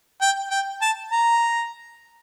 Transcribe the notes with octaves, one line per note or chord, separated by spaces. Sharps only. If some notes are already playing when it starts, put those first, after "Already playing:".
G5
G5
A5
A#5